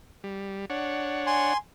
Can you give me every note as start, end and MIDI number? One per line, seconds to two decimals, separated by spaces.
0.24 0.65 55
0.70 1.53 62
0.70 1.53 73
0.70 1.53 78
1.27 1.57 80
1.27 1.57 84